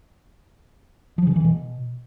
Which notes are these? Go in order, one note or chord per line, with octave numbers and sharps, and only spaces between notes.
F3
C#3
E3
B2